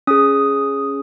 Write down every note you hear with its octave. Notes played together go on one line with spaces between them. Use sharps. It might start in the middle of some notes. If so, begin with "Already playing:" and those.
C#4 G#4 D#6